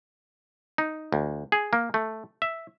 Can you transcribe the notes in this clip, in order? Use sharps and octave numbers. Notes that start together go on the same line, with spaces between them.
D#4
D2
G#4
A#3
A3
E5